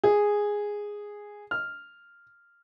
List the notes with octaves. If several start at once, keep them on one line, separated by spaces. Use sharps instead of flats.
G#4
F6